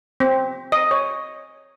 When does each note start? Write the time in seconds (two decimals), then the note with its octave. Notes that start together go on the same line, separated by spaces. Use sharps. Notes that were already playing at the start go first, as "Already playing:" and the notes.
0.20 C4
0.72 D#5
0.91 C#5